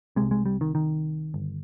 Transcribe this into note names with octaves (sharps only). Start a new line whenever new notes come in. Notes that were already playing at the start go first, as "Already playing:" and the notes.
C2 C3 G#3
G#3
G3
D#3
D#3
G1